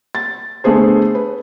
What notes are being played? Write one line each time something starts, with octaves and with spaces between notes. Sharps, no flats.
A6
D3 A3 B3 G#4 C5
B4